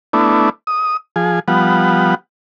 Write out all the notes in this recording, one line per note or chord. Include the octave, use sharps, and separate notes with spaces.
A3 B3 D4 E4
D#6
F3 G#4
F3 G3 B3 F#5